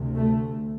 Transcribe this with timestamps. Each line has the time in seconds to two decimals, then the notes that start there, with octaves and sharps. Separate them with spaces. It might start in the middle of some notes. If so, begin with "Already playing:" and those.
Already playing: D2 C3
0.16 A3